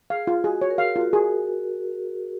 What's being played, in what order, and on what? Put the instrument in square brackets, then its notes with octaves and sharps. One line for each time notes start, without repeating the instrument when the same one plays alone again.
[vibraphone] G#4 [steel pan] F5
[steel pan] F4
[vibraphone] F#4 [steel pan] G#4
[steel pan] C#5
[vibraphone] A#4
[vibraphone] G#4 [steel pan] F5
[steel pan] F4
[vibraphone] F#4
[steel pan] G#4